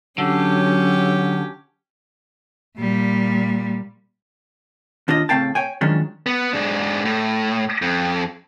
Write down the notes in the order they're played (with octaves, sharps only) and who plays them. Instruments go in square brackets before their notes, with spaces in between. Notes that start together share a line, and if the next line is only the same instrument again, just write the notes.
[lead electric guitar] D3 [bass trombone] F#3 [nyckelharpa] C#4 G4
[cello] A#2 G3
[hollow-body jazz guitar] D#2 D4 F4 D#5
A2 C#3 C4 F5 G5 A5
C#5 G5 G#5
F#2 D#3 F3 G#3 C#4 D4
[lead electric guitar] B3
G#2 D4
A2
F2